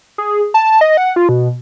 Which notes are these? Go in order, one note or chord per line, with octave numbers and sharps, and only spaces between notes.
G#4
A5
D#5
F#5
F4
B2